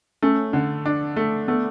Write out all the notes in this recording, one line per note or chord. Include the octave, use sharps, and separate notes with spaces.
A3 C#4
D3
D4
A3
A3 B3